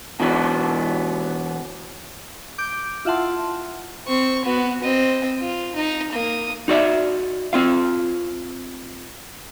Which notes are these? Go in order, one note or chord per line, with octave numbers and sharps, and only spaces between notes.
B2 E3 F#3 B3
D6 G6 D7
E4 F4 E5 F#5 A5 C6
C4 C#6
B3 F#4
C4 D#5
F4
D#4 D#5
A#3 D#6
D#4 F#4 D5 E5
C4 F4 F5